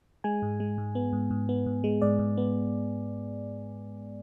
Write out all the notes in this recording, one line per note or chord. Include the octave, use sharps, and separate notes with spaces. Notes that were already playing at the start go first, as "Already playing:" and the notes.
G#3 G#5
G#2
G#3
G#2
B3
G#2
G#2
B3
G#2
G#3
G#2 D5
G#2
B3